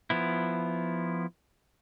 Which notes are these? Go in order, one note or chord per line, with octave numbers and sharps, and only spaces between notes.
F3 B3 E4